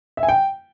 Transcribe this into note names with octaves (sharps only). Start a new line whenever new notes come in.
E5
G#5
G5